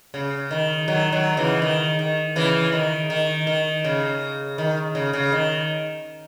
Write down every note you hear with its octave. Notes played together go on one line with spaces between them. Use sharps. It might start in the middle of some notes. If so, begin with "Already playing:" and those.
C#3
D#3
D#3 F#3
D#3 F#3
C#3 E3
D#3
D#3
C#3 E3
D#3
D#3
D#3
C#3
D#3
C#3
C#3
D#3